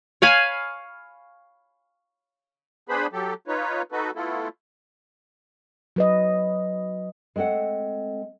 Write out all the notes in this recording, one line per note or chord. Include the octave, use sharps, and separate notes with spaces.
C#5 F5 G#5 B5
B3 D4 G#4 B4 C5 B5
F#3 G4 A4
D#4 F4 B4 C#5
D#4 F#4 A4 B4
A3 B3 E4 F4 A4
F#3 B4 D#5
G#3 A3 C4 A4 F#5